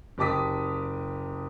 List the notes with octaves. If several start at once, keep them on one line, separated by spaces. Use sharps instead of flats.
F#1 G4 A5 D6 D#6 B6